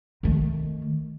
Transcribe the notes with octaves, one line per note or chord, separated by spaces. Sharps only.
D#3 A3